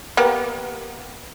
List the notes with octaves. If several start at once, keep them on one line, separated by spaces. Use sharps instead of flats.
A#3 B3 G4